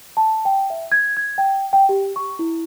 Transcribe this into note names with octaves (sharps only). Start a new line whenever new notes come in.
A5
G5
E5
G#6
G#6
G5
G5
G4
C#6
E4